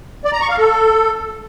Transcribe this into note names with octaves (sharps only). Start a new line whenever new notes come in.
D5
A#5
C#6
F5
A4